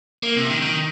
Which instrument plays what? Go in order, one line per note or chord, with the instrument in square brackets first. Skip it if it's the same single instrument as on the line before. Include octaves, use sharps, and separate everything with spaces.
[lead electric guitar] A#3
C3
D#3
D#3